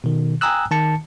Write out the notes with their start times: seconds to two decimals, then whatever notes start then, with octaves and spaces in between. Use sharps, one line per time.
0.04 B2 D#3
0.41 G5 G#5 A#5 D#6 E6 F#6
0.71 D#3 A5 C#7